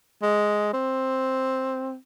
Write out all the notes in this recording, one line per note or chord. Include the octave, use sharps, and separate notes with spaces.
G#3
C4